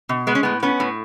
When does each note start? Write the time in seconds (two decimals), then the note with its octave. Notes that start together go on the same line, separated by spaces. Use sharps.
0.09 B2
0.27 G#3 B3
0.35 C#4
0.43 A2 B3
0.63 B3 C#4
0.80 A2